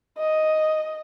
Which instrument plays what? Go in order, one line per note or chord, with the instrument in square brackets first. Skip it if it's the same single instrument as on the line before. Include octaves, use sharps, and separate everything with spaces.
[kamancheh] D#5